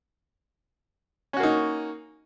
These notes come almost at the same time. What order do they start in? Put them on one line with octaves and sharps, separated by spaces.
C#4 F#4 A#3 D#4